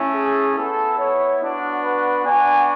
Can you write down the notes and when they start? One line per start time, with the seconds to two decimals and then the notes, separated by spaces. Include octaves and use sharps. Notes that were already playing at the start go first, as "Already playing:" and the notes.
Already playing: A3 C#4 E4
0.13 G#4
0.55 B3 E4 A4
0.97 C#5
1.39 B3 D4 F#4
1.81 B4
2.24 B3 D4 F#4 G#5